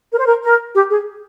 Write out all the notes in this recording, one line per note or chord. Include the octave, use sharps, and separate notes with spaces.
A#4
C5
A#4
A#4
G4
G#4